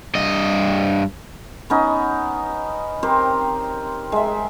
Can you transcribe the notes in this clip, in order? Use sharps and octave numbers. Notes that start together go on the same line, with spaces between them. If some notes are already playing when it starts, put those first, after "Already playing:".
G2 D#5
B3 C#4 D#4
C4 G4 A#4 C5
G#3 E5